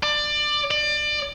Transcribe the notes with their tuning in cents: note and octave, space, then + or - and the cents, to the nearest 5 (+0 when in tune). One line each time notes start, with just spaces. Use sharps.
D5 +20
D5 +25